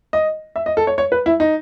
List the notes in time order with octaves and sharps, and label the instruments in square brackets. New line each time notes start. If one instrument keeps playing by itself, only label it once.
[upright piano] D#5
E5
D#5
A4
C#5
C#5
B4
E4
D#4